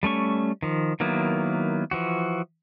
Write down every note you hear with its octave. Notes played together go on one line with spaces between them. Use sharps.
G3 A3 C#4 C#6
D#3 F3
D#3 F#3 A#3 B3 E4
E3 F3 F#4